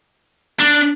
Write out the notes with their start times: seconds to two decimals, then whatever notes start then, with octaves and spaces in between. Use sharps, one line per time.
0.60 D4